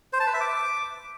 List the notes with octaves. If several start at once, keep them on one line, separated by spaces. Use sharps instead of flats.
C5
A5
B4
E5
D6